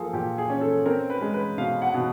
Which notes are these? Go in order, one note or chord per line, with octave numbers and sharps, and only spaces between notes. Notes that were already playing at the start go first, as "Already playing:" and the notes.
Already playing: F3 A#3 G#4 A4
A#2 G4
G#4
C#4
A4
C4 A#4
B4
G#3
B4
B2 F5
F#5
B2